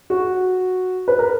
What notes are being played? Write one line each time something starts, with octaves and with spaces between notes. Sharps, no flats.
F#4
B4
A#4